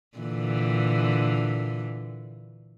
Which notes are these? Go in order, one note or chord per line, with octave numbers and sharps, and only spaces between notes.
A#2 D3 E3